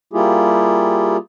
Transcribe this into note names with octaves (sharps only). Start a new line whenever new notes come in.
G3 A#3 E4 F4 G4 G#4